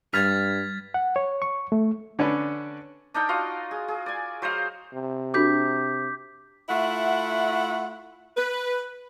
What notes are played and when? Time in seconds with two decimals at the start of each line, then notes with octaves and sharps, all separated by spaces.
0.14 G2 G3 F6 G#6 A6 B6
0.94 F#5
1.16 C#5
1.42 C#6
1.72 A3
2.19 D3 C#4 D4 B4
3.14 D4 D#4 A#4 G5
3.29 F4 F#4 D#5 F5
3.71 G#4
3.88 G#4
4.06 D5 G#5
4.42 F#3 C5 D#5 F5
4.94 C3
5.34 D4 F#4 A4 D6 G6 B6
6.69 A3 E4 F4 F#5
8.37 B4